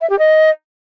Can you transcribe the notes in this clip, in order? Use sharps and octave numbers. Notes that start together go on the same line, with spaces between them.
E5
G4
D#5